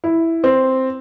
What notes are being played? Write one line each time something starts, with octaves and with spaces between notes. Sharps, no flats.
E4
C4